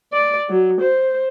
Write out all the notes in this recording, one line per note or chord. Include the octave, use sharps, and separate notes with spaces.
D5
F#3
C5